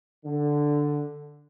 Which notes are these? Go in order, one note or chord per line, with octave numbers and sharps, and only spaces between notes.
D3